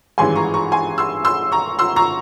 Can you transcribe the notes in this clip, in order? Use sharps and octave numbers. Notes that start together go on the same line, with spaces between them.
G#1 G2 E3 G#3 C#4 G#5 C6
A#5 C#6
A#5 C#6
G#5 C6
C6 E6
C6 E6
A#5 C#6
C6 E6
A#5 C#6